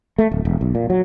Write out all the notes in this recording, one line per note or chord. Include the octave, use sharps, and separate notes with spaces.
A3
D1
E1
B1
A#2
F#3